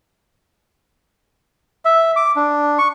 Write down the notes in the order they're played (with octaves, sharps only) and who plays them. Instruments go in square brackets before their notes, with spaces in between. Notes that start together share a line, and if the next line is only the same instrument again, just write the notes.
[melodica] E5
D6
D4
C#6